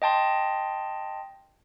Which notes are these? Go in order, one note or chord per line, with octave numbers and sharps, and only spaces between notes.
D#5 G5 A5 C6